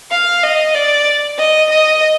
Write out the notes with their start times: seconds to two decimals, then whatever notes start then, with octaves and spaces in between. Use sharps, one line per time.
0.11 F5
0.43 D#5
0.75 D5
1.38 D#5
1.70 D#5